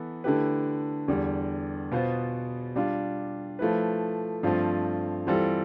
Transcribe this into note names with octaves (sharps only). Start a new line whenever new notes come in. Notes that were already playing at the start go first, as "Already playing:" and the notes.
Already playing: E3 B3 E4 A4
D3 A3 E4 G4 B4
E2 D3 G3
B2 B3 F4 C5
G3 D4 F4
F3 A3 E4 B4
G2 F3 A3 C4 F4
E3 G3 C4 F4 A4